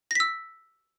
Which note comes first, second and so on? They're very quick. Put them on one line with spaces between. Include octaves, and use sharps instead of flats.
A#6 B6 E6